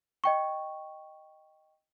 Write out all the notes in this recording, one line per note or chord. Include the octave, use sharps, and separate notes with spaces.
D#5 G5 C#6